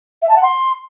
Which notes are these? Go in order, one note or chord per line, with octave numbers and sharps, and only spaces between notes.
E5
A5
F#5
C6